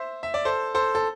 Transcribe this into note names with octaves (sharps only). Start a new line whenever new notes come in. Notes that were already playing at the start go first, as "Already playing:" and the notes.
Already playing: C5 E5
E5
D5
A4 C5
A4 C5
A4